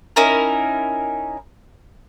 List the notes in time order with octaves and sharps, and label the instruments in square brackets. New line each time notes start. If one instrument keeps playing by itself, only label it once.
[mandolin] C#4 D#4 E4 A#4